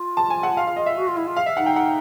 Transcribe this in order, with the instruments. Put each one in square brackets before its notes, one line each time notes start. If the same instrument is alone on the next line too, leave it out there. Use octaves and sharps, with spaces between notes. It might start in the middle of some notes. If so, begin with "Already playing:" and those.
Already playing: [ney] F4
[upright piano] A5
G#5
F#5
F5
F5
D#5
E5
[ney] F#4
F4
E4
F4
[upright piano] F5
E5
[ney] D#4 [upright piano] F#5
[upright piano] G5
F#5